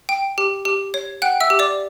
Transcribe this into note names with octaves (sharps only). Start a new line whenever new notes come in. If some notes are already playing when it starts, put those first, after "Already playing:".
G5
G4
G4
C#5
F#5 G5 F#6
E5 E6
G4
D5 D6